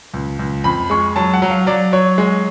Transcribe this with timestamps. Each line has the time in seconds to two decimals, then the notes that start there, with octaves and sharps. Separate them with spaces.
0.13 C#2
0.39 C#2
0.64 F2 B5
0.90 G#3 C#6
1.16 F#3 A5
1.34 F#5
1.42 F#3
1.50 F5
1.67 F#3 D5
1.92 F#3 C#5
2.18 G#3